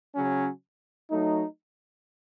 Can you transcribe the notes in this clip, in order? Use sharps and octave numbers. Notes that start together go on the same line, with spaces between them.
C#3 F#3 C#4
F#3 A3 D#4